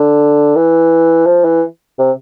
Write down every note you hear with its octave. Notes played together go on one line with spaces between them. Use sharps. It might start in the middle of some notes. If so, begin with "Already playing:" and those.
Already playing: D3
E3
F3
E3
C3